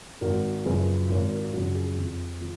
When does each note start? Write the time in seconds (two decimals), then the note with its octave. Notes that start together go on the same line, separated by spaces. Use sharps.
0.21 G#1 F#4 A#4
0.65 F#2 C#3 F3 G#4 B4
1.10 G#1 A#4 C#5
1.31 F#4 A#4
1.53 F#2 C#3 F3 F#4
1.75 G#4
1.97 F2
2.41 F3